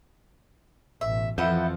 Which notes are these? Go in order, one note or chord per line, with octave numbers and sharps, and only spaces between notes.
A1 B2 E5
F2 E3 F3 A4 E5 F#5 B5 G6